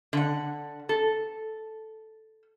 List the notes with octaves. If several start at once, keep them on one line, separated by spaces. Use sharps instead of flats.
D3 F#5
A4